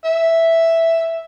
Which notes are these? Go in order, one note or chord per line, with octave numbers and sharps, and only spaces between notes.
E5